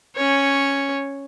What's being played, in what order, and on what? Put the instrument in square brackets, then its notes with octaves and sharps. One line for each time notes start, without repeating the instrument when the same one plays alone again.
[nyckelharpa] C#4 C#5